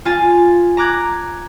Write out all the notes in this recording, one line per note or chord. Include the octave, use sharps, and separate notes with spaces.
F4 G#5 A6
A#5 D6 F#6 G#6